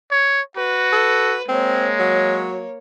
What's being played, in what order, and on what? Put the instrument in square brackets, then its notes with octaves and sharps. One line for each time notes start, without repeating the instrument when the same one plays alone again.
[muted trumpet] C#5
[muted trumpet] F#4 [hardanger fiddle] B4
[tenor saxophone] A4
[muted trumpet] G#3 [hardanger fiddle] A#3 C#5 [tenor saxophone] C4
[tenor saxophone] F#3